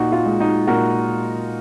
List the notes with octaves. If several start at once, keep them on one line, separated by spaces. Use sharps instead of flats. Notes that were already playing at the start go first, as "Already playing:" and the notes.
Already playing: A#2 D#4 F#4
F4
G#3
D#4 F#4
A#2 F#4 A#4